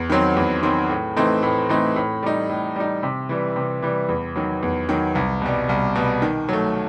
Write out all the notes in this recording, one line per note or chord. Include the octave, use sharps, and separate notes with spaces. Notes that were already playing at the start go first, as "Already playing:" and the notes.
Already playing: E2
D#3 F#3 C4
E2
D#3 F#3 C4
A2
E3 A3 C4 D#4
A2
E3 A3 C4 D#4
A2
G3 D#4
A2
G3 D#4
C3
E3 G3
C3
E3 G3
E2
D#3 F#3
E2
D#3 F#3
C2
B2 G3
C2
B2 G3
D#3
F#3 A3